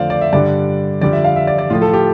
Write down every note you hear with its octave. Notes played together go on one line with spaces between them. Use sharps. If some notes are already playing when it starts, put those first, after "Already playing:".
Already playing: F2 D3 A3 C5 D5 F5
D5
E5
G2 D3 G3 D5
F2 D3 G3 D5
E5
F5
E5
D5
D5
A2 F3 A3 F4
A4
G4